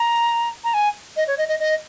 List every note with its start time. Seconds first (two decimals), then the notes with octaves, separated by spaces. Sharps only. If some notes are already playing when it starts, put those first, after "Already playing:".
Already playing: A#5
0.64 A#5
0.74 G#5
1.17 D#5
1.27 C#5
1.38 D#5
1.48 D#5
1.60 D#5